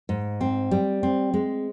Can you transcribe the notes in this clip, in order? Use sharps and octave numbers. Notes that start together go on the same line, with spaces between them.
G#2
C4
G3
C4
G#3